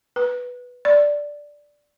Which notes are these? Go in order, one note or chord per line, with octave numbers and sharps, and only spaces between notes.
B4
D5